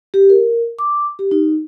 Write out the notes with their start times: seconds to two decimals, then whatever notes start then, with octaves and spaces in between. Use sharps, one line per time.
0.14 G4
0.30 A#4
0.79 D6
1.19 G4
1.31 D#4